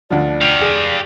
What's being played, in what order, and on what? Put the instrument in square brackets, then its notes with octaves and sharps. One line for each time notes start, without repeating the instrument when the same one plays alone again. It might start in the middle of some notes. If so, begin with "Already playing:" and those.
[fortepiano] D2 D3 F3 [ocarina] D5
[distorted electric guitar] G4 F5
[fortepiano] G#4